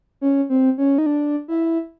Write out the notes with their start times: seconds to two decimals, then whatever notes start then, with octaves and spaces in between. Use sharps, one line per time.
0.21 C#4
0.50 C4
0.78 C#4
0.98 D#4
1.06 D4
1.48 E4